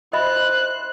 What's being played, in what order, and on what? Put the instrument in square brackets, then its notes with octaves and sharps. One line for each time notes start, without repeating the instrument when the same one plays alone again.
[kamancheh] C5 F#6 [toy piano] D#5 E5 B5